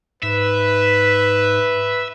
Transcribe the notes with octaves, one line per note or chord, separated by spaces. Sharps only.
G#2 B4 E5